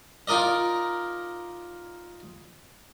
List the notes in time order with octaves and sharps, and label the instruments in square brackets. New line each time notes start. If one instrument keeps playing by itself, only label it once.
[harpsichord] D#4 F4 A#4 D5 D#5